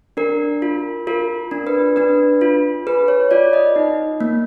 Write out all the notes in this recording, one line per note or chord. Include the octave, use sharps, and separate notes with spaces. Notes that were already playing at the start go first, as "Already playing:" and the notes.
D4 A#4
F4
F4 A#4
D4
B4
D4 B4
F4
G#4 B4
C#5
F4 D5
D#5
D#4
A#3